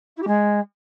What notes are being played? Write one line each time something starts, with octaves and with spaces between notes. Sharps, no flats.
E4
G4
G#3